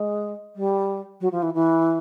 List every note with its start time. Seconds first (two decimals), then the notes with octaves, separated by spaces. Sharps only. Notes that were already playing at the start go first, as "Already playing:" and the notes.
Already playing: G#3
0.56 G3
1.21 F#3
1.32 F3
1.42 E3
1.54 E3